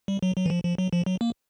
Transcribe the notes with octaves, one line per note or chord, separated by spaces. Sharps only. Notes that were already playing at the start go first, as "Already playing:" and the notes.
G3
F#3
F#3
E3
F3
F3
F#3
F3
F#3
A#3